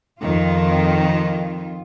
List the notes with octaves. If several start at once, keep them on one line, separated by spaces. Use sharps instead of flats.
F2 D#3 F4